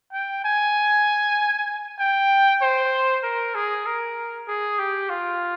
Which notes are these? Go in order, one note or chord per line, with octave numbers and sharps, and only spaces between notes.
G5
G#5
G5
C5
A#4
G#4
A#4
G#4
G4
F4